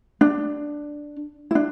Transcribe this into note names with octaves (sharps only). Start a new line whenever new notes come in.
D4
E4
D4